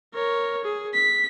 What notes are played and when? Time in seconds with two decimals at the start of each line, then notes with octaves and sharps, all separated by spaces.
0.14 A#4 C#5
0.64 G#4
0.94 B6